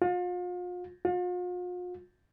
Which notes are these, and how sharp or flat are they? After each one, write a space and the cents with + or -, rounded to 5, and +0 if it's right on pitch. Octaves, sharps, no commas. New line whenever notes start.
F4 +40
F4 +45